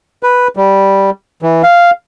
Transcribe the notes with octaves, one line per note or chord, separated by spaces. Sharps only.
B4
G3
E3
F5